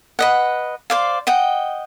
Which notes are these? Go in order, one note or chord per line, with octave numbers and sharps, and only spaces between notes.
B4 D#5 F#5
C5 D5 F5
D#5 F#5 G5